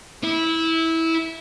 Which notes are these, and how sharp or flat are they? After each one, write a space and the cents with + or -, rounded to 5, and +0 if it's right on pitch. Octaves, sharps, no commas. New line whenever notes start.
E4 -15